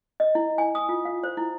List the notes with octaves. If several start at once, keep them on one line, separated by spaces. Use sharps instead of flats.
D#5
E4
G#5
D#6
F4
F5
C5
E4